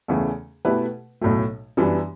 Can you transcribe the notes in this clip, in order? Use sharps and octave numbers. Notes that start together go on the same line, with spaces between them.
E2 C#3 E3 A3
B2 A3 E4 G4 B4
B1 A2 F#3 A3
F#2 E3 G3 B3 D4